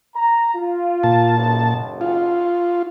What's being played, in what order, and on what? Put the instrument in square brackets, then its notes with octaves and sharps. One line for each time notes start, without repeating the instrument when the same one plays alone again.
[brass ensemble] A#5
F4
[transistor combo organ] A#2 A5
[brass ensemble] F#1 B1
[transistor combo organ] F4